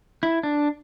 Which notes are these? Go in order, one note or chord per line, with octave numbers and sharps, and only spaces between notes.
E4
D4